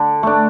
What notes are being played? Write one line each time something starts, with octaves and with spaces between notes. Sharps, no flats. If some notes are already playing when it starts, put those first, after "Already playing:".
Already playing: D3
A3 D4